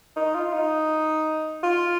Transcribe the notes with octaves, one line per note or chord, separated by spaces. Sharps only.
D#4
F4
D#4
F4